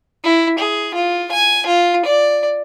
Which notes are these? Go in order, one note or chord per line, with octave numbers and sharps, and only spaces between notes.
E4
G#4
F4
G#5
F4
D5